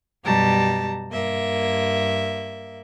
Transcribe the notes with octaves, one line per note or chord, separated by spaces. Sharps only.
F#2 B2 G3 G4 A5 A#5
G2 A#3 E5